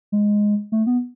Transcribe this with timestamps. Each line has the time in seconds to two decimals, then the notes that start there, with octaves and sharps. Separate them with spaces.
0.12 G#3
0.72 A3
0.87 B3